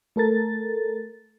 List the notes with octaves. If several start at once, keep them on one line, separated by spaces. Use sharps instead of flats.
A3 A4 A#4 A6